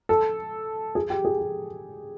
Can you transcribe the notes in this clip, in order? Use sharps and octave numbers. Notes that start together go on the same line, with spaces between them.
A4
G#4
G4
G#4
G4